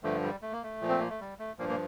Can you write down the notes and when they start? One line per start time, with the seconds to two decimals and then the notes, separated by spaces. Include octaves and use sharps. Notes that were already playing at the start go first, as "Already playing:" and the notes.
0.03 G2 D3 F3 A3
0.23 G3
0.42 A3
0.52 A#3
0.63 A3
0.81 A#2 F3
0.89 C4
0.99 A#3
1.10 A3
1.21 G3
1.39 A3
1.59 G2 A#2 F3 A#3
1.69 A#2 A#3